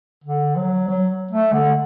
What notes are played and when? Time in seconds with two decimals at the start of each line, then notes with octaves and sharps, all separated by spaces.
0.24 D3
0.56 F#3
0.88 F#3
1.31 A3
1.53 D3